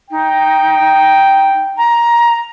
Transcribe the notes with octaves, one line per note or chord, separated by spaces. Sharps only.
D#4 G5
A#5